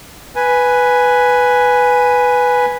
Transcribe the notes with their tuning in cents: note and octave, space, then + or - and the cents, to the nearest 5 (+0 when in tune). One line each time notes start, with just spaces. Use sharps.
B4 +0 G#5 +0